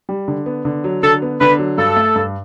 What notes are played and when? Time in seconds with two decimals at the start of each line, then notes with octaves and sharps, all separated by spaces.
0.09 G3
0.28 D3
0.46 B3
0.65 D3
0.84 F#3
1.03 D3 A4
1.22 B3
1.40 D3 B4
1.59 F#3
1.78 G2 A4
1.97 A3
2.16 G2